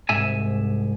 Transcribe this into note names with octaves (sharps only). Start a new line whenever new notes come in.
C2 G#2 E5 G#5